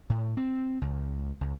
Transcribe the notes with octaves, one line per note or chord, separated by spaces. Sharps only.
A2
C4
C#2
C#2